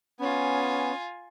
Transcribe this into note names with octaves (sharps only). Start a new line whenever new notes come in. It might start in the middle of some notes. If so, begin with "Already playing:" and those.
B3 C#4 F4 G#5